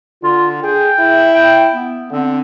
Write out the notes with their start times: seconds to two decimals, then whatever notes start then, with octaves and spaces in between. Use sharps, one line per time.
0.23 D3 F4
0.63 G#4 G5
0.99 E4
1.34 G5
1.72 B3
2.11 D3 C4